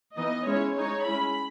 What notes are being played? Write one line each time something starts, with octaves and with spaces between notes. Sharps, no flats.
E3 B3 D#4 D#5
G#3 C#4 E4 C#5
G#3 D#4 C#5
G#3 C#4 E4 B5